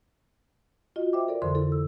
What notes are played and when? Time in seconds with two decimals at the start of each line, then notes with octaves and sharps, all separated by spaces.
0.96 F4 F#4 D#5
1.13 C5 E5 G5 D6
1.28 A4 A#4 D5
1.42 F2 D3 E3 C5 C6
1.55 E4 A4
1.72 E6